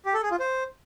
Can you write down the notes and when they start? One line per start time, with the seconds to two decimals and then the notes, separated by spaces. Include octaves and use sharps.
0.06 G4
0.14 A4
0.23 G#4
0.31 F4
0.40 C5